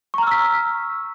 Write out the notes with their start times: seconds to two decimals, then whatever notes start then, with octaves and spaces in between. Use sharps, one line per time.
0.14 C#6
0.18 A#5
0.23 F6
0.27 E6
0.31 B6